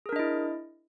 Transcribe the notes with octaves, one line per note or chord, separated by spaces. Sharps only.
D4 E4 G#4 A#4 D#5